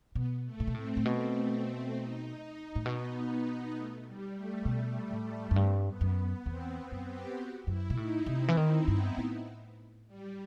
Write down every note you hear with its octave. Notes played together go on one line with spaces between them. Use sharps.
B2 B3
A3
A2
B2
A2 C4
A2
B2
D#4
D#4
A2
B2 B3
B3
D#4
A3
G3
A3
B2 G3
G3
A2
A3
F#2
G2 C4
B3
F#2
B3
E2 C4
C4
F#2
G4
F#4
F#2 E4
B2
A2 D#4
C3 C4
E3
D#3 D#4
G2 B3
A2
G3